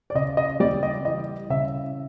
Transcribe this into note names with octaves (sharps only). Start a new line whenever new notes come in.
D5
C#3 D#5
D#5
G3 D5
D#5
E3 D#5
C#3 E5